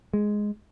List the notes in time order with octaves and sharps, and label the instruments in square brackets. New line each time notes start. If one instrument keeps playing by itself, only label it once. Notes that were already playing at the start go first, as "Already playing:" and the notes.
[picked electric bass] G#3